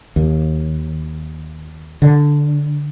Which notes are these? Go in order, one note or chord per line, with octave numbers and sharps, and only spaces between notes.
D#2
D3